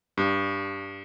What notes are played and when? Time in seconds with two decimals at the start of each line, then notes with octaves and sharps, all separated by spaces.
0.17 G2